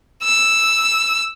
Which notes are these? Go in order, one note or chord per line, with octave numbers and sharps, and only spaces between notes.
E6